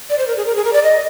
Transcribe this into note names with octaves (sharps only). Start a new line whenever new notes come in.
D5
C5
A#4
G#4
A#4
G#4
A#4
D5
D#5